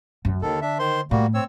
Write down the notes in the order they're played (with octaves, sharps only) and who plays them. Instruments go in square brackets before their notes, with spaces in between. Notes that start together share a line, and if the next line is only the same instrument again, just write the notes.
[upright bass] F#2 F3
[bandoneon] D#2 D#3 A4 [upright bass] D3
[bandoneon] D4 E5
D#3 C5 C6
[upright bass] A2 [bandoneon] G3 A#3 F#4
[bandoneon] C4 C#5 E6